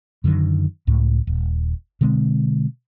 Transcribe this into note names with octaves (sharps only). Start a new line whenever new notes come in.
F#2 D3 D#3 F#3
C#2 A2
D#1
B2 D3 G#3 C4